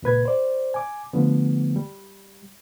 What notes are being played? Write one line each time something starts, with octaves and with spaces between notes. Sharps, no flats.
C#2 A#2 B4 G#6
C5 D5
G#5 D6
D3 F3 A3 B3
G3